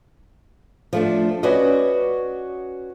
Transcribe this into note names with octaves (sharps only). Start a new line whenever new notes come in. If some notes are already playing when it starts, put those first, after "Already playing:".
F3 A3 D4
C#4 F#4 B4 D5 D#5